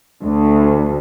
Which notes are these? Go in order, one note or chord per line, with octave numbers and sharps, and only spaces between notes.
D2